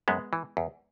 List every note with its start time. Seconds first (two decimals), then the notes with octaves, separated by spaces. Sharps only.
0.08 F#2 G#3 B3
0.33 E3
0.57 E2